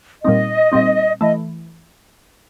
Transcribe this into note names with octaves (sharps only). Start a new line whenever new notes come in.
A#2 G3 C4 D#4 D#5
A#2 G3 C4 D#4
E3 A3 D#5